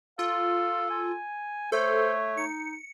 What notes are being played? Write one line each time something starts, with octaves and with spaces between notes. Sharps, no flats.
F4 A4 F5
G#5
A3 A4 C5 C#5
D#4 C#7